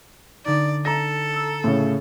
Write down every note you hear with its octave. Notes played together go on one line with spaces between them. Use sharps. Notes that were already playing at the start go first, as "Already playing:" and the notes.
D3 D#4 D5
A4 A#5 A#6 E7
E6
A2 C#3